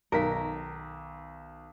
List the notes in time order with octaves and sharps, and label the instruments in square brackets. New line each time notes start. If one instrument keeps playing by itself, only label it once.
[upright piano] B1 D#3 B6 [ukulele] A#4